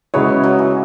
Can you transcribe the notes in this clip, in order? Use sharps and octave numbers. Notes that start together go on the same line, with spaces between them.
C#3 F#3 G#3 B3 E4 C#5
F#3
E3